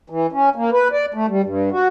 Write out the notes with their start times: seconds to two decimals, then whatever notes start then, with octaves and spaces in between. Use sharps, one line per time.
0.10 E3
0.32 C#4
0.56 A#3
0.72 B4
0.92 D5
1.14 A3
1.28 G3
1.44 G2
1.72 F#4